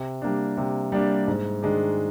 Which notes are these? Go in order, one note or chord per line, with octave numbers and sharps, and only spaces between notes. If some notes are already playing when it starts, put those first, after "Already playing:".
Already playing: C3
G3 A#3 D4
C3
G3 A#3 D4
G#2
D#3 G#3 D4